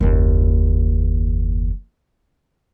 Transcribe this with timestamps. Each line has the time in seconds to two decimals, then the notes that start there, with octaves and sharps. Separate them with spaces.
0.01 F#1 D#2